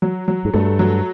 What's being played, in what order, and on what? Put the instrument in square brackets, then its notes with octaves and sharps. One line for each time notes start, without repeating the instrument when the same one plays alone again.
[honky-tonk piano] F#3
F#3
[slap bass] G#2
[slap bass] G2 [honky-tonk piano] A3
[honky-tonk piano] F#3